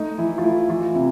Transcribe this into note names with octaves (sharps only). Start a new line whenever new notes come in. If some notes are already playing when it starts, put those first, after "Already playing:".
Already playing: A3 D#4
E3 E4
F4
A3 E4
E3 F4
C3 E4